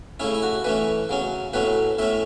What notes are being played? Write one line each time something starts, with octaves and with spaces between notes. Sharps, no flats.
C#3 A3 C#4 E4
E4
F#4
E3 A3 C#4 B4
C#3 F#3 C#4
A2 F#3 A3 C#4 B4
A2 A3 C#4 E5